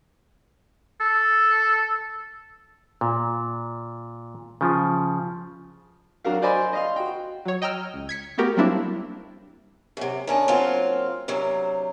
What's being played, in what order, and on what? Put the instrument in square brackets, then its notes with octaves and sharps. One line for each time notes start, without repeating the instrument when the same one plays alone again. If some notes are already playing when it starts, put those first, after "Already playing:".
[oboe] A4
[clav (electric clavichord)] A#2
C#3 F3
[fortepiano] F#3 D4 F#4 A#4 F5
C5 D5 D#5 G#5 B5 C6
D#5 F5 C6
F#4 G5
[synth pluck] F#3 C#5
D#5 G5 A#5 E6 F6
C#2
G#6 B6 C#7
A3 B3 F#4 G4 A#4
F#3 G3 A#3 C4 D4 E4
[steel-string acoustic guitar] F#2 C3
D#3 C#4 D4
F#3 A#3 C4 F4
D2 C3 F#3